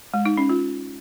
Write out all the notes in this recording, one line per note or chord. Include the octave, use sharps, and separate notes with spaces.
G#3
D#4
C#4
F4